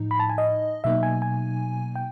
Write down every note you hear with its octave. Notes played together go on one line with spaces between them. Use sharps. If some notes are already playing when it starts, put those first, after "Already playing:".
Already playing: A2 F3 D#4
B5
A5
G#5
D#5
B2 F#3 A#3 D#4 E5
G#5
G#5
G5